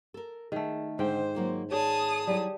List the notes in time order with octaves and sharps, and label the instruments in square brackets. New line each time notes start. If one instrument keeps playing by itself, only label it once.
[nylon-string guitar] A4 A#4
[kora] D#3 A3 [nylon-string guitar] G#4
[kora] G#2 G5 [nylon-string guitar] D3 [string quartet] C5
[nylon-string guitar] F#3 A#3 F4
[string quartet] G#4 A5 D#6 [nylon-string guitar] C#5 D5
[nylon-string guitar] F#3 E4 [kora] G3